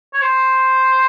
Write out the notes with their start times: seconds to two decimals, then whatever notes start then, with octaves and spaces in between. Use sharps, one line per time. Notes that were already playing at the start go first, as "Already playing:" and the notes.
0.14 C#5
0.22 C5